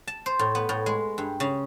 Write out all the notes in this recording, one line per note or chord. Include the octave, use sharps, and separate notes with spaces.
A5
C5
A2
B3
A2
G#3
G2
C#3